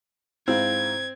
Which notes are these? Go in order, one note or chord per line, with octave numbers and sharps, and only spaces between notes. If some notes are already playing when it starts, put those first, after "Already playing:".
G#2 C4 E4 F5 G#6